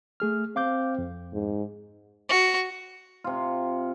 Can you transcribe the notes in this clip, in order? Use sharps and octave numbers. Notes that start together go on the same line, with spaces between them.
A3 G#4 F6
C4 F5 D6 G6
F2
G#2
F#4
C3 F4